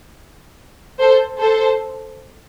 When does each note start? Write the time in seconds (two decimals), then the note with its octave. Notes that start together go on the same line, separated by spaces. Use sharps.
0.99 A4 C5
1.39 A4 C5